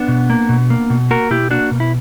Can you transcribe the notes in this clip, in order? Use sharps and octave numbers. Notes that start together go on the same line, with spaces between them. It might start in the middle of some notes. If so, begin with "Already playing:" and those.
Already playing: B3 D4
B2
A#3
B2
A#3
B2
A#3 F#4 A#4
B2 E4 G4
A#3 D4 F#4
B2
E4